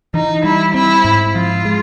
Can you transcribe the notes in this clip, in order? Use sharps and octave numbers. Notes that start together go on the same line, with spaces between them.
E3 D#4
G3 E4
C4 E4
G#2
F3 F4
G#3